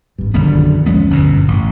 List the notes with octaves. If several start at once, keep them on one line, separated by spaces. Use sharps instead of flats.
G#1 G2
A#1 F#2 D3 D#3 G3 B3
D#2 F3 G#3 A#3 B3 C#4
G1 F#2 B2
A1